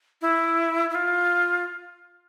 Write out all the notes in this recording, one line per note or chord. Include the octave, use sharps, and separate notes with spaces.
E4
E4
F4